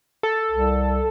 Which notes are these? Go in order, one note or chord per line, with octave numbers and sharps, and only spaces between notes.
A4
C2